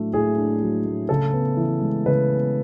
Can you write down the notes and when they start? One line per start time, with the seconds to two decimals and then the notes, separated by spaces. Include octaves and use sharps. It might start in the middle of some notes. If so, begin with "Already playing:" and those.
Already playing: A2 F#3 A3 D4
0.13 A2 G#4
0.37 D4
0.62 F#3
0.85 A3
1.09 C#3 A4
1.33 B3
1.57 E3
1.81 G#3
2.06 C#3 B4
2.30 B3